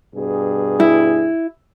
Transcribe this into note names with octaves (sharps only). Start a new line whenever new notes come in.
G2 B2 G#4
E4